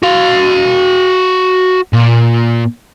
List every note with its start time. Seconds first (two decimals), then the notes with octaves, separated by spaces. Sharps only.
0.03 F#4 F5
1.93 A#2